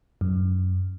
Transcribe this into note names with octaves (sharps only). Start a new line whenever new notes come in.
F#2